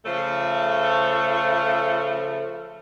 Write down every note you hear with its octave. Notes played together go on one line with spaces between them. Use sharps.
C#3 F3 A3